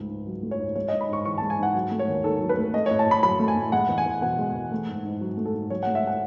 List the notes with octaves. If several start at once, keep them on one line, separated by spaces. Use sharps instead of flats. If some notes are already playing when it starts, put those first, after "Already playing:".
Already playing: C#2 G#2 A3
G#2
F#3
A3
C#5
G#2
G#3 C#5
G#2 D#5
B5
G#2 C#6
E3 C#6
G#3 A5
G#5
G#2 F#5
F#3
A3
C#5
D#2
D#3 A4
F#3
B4
A3
A3 D#5
A2 C#5
A5
A2 B5
F#3 B5
A3
G#5
A2
G#3 F#5
E2
G#5
E2
B2 F#5
G#3
E2
A3
G#2
G#2
F#3
A3
A4
G#2
F#3 C#5
A3 F#5
E5
F#5